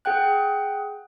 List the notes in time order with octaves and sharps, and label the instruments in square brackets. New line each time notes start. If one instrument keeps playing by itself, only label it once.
[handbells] G#4 F#5 G5 F#6